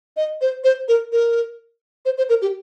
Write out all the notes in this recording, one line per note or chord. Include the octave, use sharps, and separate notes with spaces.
D#5
C5
C5
A#4
A#4
C5
C5
A#4
G4